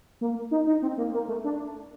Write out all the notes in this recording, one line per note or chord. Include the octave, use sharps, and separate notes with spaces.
A#3
D#4
D#4
C4
A#3
A#3
A3
D4